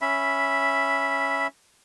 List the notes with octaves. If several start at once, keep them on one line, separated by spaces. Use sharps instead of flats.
C#4 E5 B5